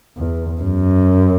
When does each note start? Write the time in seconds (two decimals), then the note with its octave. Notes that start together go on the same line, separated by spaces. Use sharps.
0.18 E2
0.61 F#2